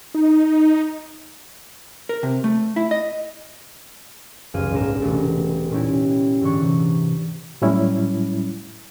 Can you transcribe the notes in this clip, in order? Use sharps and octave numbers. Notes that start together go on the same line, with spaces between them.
D#4
A#4
C3
A3
E4
D#5
F1 C#2 F#2 G#4 F5 D#7
A#1 G#2 B3 A#4 E7
E1 C2 B2 A3 G4 A4
A#2 B3 C#4 D#4 E4 G4
G#2 D3 E3 C#6
C3
A2 F#3 G3 C#4 E4